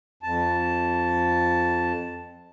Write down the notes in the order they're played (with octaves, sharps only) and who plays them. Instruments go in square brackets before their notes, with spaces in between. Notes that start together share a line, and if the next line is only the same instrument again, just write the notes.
[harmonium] F2 A5